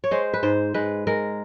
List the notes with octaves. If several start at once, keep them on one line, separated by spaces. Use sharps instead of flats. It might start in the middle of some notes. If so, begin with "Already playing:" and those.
C#5
G#3 C5
B4
G#2 C5
G#3 B4
G#3 A#4